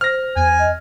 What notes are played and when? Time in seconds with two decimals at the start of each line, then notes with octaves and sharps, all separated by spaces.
0.01 C5 F6 A#6
0.36 E2 G#5
0.59 D#5